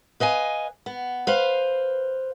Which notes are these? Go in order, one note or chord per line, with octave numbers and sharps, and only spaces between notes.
B4 D#5 F5 G#5
B3
B4 C5 F5